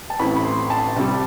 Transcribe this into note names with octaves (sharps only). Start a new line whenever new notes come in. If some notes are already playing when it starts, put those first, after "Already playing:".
A5
A1 A2 E3 A3 C4 B5
B5
C6
A5
C2 C3 G3